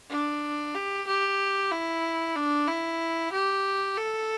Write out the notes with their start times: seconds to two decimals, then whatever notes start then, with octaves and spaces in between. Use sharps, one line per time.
0.10 D4
0.74 G4
1.07 G4
1.71 E4
2.36 D4
2.68 E4
3.32 G4
3.97 A4